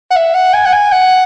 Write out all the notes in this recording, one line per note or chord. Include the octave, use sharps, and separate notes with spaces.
F#5
E5
F#5
G#5
F#5
G#5
F#5